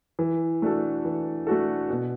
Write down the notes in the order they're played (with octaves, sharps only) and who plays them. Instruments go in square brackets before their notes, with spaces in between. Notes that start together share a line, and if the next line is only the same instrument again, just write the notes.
[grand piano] E3
A3 D4 F#4 A4
E3
A3 D4 F#4 A4
B2